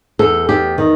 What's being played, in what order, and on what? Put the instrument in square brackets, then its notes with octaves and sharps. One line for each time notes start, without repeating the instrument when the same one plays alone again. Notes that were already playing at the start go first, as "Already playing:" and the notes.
[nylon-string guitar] E2 A4
E2 G4
D#3